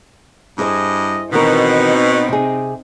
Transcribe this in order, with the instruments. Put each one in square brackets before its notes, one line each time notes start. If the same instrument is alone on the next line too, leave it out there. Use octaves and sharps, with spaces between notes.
[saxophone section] G2 D#5 [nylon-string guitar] E4 G#4 C5
[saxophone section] B2 [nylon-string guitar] D#3 E3 A#4 [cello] C4 D#4
[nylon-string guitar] C3 G#4